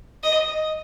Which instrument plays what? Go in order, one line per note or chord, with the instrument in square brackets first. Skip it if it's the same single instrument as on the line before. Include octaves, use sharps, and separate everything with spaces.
[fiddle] D#5